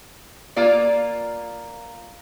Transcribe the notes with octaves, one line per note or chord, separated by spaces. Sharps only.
A#3 F4 D5